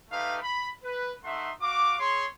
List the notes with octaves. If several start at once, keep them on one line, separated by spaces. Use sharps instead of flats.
A3 D#4 G4 B4 F5
B5
B4
A3 D#4 E5 F#5 C6
F#4 F5 D6
G#4 C#5 C6